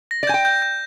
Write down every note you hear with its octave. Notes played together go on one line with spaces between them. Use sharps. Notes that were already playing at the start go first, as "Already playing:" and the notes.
A#6
D5
G#5 G6
G5
G6
G6